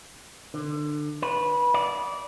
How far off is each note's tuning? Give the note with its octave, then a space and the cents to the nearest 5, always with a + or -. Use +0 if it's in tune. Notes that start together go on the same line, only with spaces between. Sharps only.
D3 +25
B4 -20
D5 -20